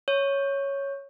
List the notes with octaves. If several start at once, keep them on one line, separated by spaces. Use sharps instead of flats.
C#5